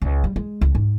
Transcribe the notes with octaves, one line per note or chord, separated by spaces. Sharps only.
C#2
G3
G#3
C#2
G#2